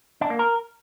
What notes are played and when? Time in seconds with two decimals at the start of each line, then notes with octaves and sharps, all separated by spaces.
0.21 D4
0.30 A#3
0.39 A#4